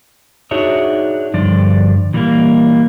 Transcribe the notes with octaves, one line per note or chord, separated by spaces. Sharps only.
D4 D#4 F#4 G#4 C#5 E5
G2 D3 F3 D5
A#2 E3 G3 A3 A#3